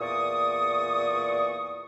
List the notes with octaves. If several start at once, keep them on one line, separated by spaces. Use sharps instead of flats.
E2 A#2 D5 C#6 D#6